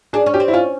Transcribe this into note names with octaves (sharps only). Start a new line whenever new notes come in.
D4 G#4
C#4
G4
C4
E4
C#4 F4